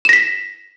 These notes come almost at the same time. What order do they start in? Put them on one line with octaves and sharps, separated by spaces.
E7 A#6 B6